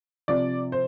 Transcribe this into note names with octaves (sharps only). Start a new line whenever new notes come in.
C3 F3 D5
C5